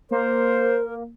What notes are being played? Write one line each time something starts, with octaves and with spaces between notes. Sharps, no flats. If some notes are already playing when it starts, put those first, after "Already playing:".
A#3 A#4 C5